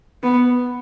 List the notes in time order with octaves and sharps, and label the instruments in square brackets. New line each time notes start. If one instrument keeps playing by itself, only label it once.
[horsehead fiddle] B3